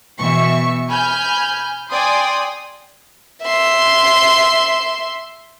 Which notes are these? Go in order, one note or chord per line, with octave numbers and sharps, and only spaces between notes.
B2 E3 E5 C#6
G#5 B5 F6 G6
D5 G5 G#5 C6 D#6
E5 C6